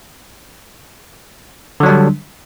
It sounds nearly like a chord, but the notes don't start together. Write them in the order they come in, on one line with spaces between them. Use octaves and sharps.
D3 F#3 D4 G3